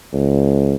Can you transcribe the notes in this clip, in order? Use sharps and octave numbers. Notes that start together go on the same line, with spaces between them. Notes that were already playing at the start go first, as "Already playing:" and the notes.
C#2